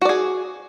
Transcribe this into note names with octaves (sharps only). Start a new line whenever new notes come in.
F#4 G#4 D5